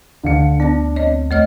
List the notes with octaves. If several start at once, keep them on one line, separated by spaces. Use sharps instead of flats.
D2 D3 F5 C#7
B3 D4 A#6
C4 C#5 D#5
D#2 A3 C#5 D#5 F6